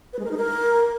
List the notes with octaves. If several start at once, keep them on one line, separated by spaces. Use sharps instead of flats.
B4
G#3
A#4
D#4
A#4